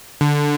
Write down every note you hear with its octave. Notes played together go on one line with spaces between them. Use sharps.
D3